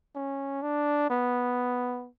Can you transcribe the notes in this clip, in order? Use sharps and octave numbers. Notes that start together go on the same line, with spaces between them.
C#4
D4
B3